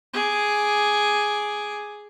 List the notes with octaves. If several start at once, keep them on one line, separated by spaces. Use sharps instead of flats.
G#4 D6